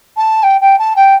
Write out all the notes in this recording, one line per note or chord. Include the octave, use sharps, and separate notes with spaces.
A5
G5
G5
A5
G5